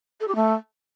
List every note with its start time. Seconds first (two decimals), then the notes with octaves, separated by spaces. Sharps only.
0.20 A4
0.28 G4
0.35 A3